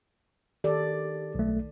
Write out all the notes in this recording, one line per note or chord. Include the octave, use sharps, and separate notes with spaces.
D#3 G4 A4 D5
B1 A3